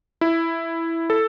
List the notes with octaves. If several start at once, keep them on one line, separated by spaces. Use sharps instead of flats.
E4
A4